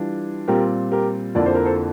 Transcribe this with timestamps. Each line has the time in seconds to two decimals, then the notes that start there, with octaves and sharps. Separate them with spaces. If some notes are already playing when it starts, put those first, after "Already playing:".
Already playing: E3 G3 D4 F4
0.47 A#2 G3 C4 F4 G4 A#4
0.92 G4 A#4
1.35 F2 D3 F3 A#3 E4 D5
1.46 C5
1.55 A#4
1.65 A4 C5